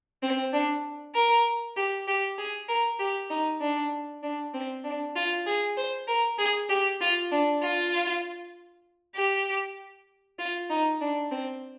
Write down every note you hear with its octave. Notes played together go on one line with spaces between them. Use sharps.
C4
D4
A#4
G4
G4
G#4
A#4
G4
D#4
D4
D4
C4
D4
F4
G#4
C5
A#4
G#4
G4
F4
D4
F4
G4
F4
D#4
D4
C4